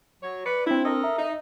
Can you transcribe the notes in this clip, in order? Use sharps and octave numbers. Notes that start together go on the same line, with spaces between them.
F#3 C#5
B4 D5 C#7
C4 D4 E4
A4 A#4 D#5
E5 A#5
D#4